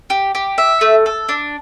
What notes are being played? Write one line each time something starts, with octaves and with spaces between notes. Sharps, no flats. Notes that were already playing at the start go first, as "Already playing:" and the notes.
G4
G4
E5
A3
A4
D4